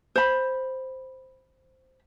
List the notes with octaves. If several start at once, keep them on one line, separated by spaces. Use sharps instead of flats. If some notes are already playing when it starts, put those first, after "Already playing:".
C5 B5